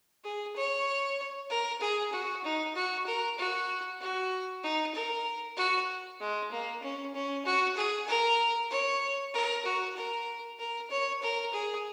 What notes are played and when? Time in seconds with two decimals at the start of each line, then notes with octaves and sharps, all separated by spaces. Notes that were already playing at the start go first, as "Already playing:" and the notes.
0.24 G#4
0.56 C#5
1.50 A#4
1.81 G#4
2.12 F#4
2.44 D#4
2.75 F#4
3.06 A#4
3.38 F#4
4.00 F#4
4.63 D#4
4.94 A#4
5.57 F#4
6.20 G#3
6.51 A#3
6.82 C#4
7.14 C#4
7.45 F#4
7.76 G#4
8.07 A#4
8.70 C#5
9.34 A#4
9.65 F#4
9.96 A#4
10.59 A#4
10.90 C#5
11.22 A#4
11.53 G#4